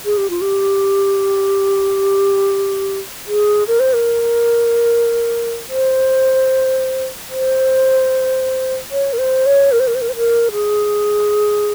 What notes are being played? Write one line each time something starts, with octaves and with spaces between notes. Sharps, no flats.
G#4
G4
F4
G4
G#4
A#4
C5
A#4
C5
C5
C#5
A#4
C5
C#5
A#4
C5
A#4
C5
A#4
C5
A#4
G#4